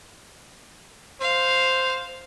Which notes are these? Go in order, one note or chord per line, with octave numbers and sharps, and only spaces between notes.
C5 F5